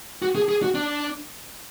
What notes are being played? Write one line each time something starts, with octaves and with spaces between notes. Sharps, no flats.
F#4
G#4
G#4
F#4
D4